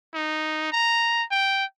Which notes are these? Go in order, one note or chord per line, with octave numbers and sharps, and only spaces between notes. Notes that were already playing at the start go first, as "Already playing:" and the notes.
D#4
A#5
G5